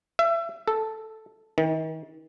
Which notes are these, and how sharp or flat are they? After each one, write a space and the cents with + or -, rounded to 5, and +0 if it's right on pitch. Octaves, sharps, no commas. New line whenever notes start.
E5 +30
A4 -5
D#3 +40